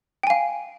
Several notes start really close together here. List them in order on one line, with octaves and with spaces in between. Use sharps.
G5 G#5 F5